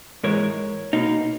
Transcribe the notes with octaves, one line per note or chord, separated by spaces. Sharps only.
G#2 E3 G#3 A#4 C#5
B2 A#3 D#4